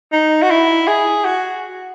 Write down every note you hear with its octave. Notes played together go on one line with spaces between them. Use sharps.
D#4
F#4
E4
G#4
F#4